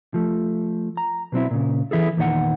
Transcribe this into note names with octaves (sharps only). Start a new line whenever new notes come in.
F3 A3
A#5
B2 F#3 C4 E4
A#2 C#3
E3 E4 G#4 A4
E2 A#2 D#3 D5 F#5